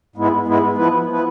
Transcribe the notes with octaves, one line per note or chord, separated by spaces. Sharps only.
G#2 G#3 B3 E4
G#2 G#3 B3 E4
F3 B3 E4 B4
F3 B3 E4 B4